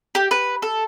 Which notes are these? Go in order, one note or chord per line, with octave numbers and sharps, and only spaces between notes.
G4
B4
A4